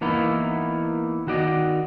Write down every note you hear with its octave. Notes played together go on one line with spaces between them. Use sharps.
E3 A#3 B3 D#4 E4
D#3 F#4 D5 D#5